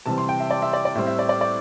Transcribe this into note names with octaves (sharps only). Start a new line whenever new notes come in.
C3 E3 G3 C4 A5
C6
G5
E5
D5
E5
D5
D5
A2 G3 C4 E5
E5
D5
D5
D5